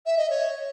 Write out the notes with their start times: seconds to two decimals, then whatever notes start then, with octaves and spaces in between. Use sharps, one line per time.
0.06 E5
0.18 D#5
0.30 C#5